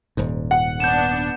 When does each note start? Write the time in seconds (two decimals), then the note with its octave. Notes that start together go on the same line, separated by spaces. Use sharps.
0.17 D#1 G#2
0.51 F#5
0.80 B3 D4 G6 E7